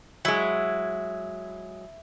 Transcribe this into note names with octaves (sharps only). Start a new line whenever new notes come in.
F#3 G#3 E4